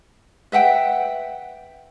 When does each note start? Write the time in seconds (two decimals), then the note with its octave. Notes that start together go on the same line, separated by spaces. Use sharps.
0.52 B4 E5 F#5 G5